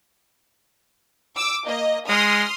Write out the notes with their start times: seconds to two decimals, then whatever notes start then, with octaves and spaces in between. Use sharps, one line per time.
1.36 D6 E6
1.66 A#3 D#5
2.09 G#3 C6 D#6 F6